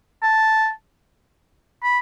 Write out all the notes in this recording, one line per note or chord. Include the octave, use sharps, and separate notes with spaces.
A5
B5